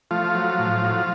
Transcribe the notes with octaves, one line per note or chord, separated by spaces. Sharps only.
F3 A3 F4
F#3
A2
F#3